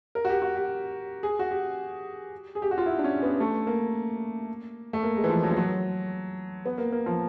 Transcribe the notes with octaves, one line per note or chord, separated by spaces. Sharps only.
A#4
F#4
G4
F#4
G4
G#4
F#4
G4
G#4
G4
F#4
F4
E4
D4
C#4
B3
A3
A#3
A3
A#3
G#3
E3
F3
F#3
F3
F#3
B3
A#3
A#3
F3